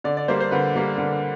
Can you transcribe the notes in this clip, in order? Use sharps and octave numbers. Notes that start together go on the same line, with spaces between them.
D3 D5
D5
G3 A#3 C5
C5
D3 B4
G3 A#3
D3